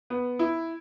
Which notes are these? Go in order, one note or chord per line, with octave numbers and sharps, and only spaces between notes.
B3
E4